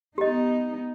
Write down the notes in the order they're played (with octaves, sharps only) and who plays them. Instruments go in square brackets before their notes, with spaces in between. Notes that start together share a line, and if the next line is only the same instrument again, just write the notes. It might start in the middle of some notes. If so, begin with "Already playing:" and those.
[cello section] B3 D#4 [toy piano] G4 D#5